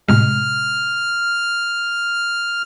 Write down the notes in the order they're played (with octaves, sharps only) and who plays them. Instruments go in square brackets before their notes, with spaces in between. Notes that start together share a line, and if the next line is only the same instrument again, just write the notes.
[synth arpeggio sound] A2 C3 G#3 [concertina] F6